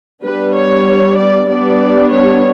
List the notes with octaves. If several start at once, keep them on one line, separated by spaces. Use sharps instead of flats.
G3 B3 D4 B4
C#5
D5
G3 B3 D4 D5
C#5